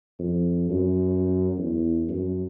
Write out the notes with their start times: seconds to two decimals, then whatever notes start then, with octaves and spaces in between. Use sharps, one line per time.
0.19 F2
0.70 F#2
1.58 E2
2.09 F#2